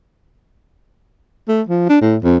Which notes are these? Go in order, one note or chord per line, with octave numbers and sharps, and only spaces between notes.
A3
F3
D4
A2
F2